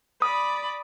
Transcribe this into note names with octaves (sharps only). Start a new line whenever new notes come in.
D5 B5 D#6